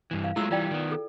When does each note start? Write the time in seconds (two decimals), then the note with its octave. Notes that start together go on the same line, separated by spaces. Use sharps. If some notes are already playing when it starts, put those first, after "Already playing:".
0.11 G2 E3
0.24 F5
0.36 F#3 G#3 A3 E4 F4 E6
0.51 E3 G3 F4 D5 G5
0.71 D#3 B3
0.91 A4